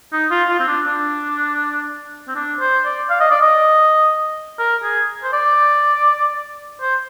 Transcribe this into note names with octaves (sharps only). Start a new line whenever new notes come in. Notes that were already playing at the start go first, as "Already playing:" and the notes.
D#4
F4
F4
C4
D4
D4
C4
D4
C5
D5
F5
D#5
D5
D#5
A#4
G#4
C5
D5
C5